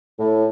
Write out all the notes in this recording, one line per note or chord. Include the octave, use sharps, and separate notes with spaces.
A2